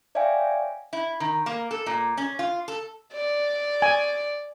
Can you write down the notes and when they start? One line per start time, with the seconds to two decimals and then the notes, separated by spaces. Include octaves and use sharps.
0.15 C#5 D5 E5 F5 G5 G#5
0.93 E4
1.20 D#3
1.46 A#3
1.71 A4
1.86 A#2
2.17 C#4
2.39 F4
2.68 A4
3.13 D5
3.82 G#5